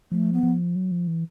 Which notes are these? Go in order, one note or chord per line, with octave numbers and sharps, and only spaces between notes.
F3 A3
B3
F3
F#3
F3
E3